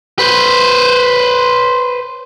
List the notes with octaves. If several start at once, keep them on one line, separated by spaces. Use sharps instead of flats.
B4 C5